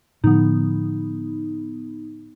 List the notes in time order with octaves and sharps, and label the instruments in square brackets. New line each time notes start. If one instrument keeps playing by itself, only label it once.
[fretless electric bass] A2 D3 F3 [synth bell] B3 D#4